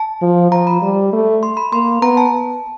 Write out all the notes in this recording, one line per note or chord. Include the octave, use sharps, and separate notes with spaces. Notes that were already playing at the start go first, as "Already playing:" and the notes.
Already playing: A5
F3
F3 A#5
B5
G3
A3
C6
B5
A#3 C6
B3 A#5
A5